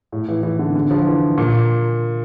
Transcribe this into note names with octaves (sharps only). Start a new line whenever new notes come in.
A2
E3
E3
D3
D3
F3
E3
A#2